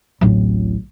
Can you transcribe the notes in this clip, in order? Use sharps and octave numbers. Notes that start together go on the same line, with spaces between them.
D1 A1